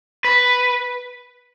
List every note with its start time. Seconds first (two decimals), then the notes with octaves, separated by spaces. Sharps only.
0.24 B4